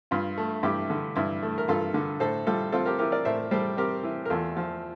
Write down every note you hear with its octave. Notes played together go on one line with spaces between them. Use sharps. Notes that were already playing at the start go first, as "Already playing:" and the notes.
G2 F4
A3
G2 E4 G4
D3
G2 E4
A3
A#4
G2 F4 A4
D3
A2 A4 C5
G3 F4 A4
C4 F4 A4
G4 A#4
E3 G4 A#4
A#4 D5
A2 C5 E5
G3 A4 C5
C4 G4 A#4
E3
A#4
E2 F4 A4
F3